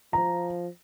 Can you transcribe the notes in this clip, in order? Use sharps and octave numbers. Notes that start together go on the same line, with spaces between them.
F3 A#5